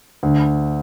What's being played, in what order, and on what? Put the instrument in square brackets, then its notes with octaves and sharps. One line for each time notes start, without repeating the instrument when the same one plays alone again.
[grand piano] D2